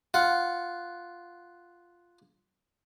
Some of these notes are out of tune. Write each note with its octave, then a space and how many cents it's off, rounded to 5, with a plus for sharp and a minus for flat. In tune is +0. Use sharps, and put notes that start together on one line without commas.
F4 +0 F#5 +0